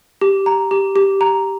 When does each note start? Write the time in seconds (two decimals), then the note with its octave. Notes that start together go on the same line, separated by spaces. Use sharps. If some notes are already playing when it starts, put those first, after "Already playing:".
0.21 G4
0.46 A#5
0.71 G4
0.96 G4
1.21 A#5